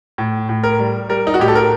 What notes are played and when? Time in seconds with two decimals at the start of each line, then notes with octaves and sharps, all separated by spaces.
0.18 A2
0.49 A2
0.64 A#4
0.79 G3
1.09 G3 A#4
1.27 D#4
1.34 F#4
1.40 A2 G4
1.48 A4
1.55 A#4